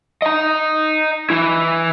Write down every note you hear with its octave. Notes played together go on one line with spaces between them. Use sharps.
D#5 A#5
E3 E4